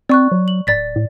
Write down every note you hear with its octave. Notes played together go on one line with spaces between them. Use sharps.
C4 D5 C#6 F#6
F#3
F#7
D1 D5 A6 B6
A2